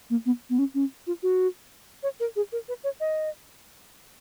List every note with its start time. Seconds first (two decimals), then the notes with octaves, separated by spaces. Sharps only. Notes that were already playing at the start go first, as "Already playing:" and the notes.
0.10 A#3
0.26 B3
0.50 B3
0.58 C#4
0.74 C#4
1.07 F4
1.23 F#4
2.03 C#5
2.20 A#4
2.36 G#4
2.52 A#4
2.68 B4
2.84 C#5
3.00 D#5